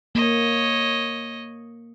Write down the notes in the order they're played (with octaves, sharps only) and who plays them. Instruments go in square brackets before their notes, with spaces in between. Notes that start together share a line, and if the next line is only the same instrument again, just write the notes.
[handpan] A#3 [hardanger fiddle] C#5 D#5